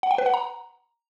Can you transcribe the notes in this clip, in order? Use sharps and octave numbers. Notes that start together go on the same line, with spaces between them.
F#5
G5
B4
F#5
A#5